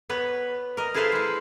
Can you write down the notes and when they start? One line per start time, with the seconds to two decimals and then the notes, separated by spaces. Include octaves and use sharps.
0.09 B3 B4 C#5
0.77 A#4 D#5
0.94 E4 G#4 A4 B4 C5 F5
1.12 G#3 E4